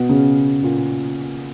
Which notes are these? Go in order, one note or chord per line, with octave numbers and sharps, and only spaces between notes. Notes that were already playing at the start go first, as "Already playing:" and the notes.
Already playing: B2 B3
C#3 C#4
A#2 A#3